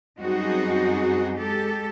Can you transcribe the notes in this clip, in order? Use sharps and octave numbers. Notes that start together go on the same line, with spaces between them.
F#2 G3 C4 D#4 F#4 G#4
G#3 G4 A4